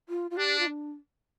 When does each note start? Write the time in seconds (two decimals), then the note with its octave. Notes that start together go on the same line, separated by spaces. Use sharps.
0.09 F4
0.31 F4
0.37 D4 G4
0.59 F4
0.66 D4